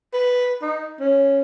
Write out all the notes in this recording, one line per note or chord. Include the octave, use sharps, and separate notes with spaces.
B4
D#4
C#4